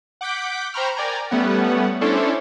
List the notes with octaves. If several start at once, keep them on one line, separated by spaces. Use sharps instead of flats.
F#5 D6 G6 B6 D7
C5 G5 A#5 B5 C#6 F6
A#4 D5 G5 G#5 A#5
G3 A3 B3 C#4 F#5
C#4 D4 E4 A4 C5 C#5